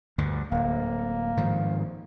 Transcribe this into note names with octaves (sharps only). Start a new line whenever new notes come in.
D2 G2 D3
D1 A#3
G#2 D#3 F3